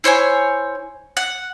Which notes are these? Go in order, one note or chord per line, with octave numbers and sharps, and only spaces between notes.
E4 C5 C#5 G#5
F#5